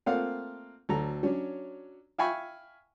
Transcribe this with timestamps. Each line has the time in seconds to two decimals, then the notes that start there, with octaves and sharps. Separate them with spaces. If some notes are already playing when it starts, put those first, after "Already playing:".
0.06 A3 A#3 C4 F4 F5 F#5
0.89 D2 F#3 A4 A#5
1.23 F#3 C#4 D4
2.18 E5 F5 G5 G#5 B5 C#6